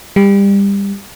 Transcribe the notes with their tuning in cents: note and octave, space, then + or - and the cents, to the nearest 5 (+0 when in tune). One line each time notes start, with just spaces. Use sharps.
G3 +25